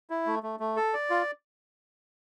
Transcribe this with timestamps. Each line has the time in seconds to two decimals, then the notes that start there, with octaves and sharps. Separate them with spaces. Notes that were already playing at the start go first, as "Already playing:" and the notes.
0.10 E4
0.26 A3
0.43 A3
0.60 A3
0.76 A4
0.94 D5
1.10 F4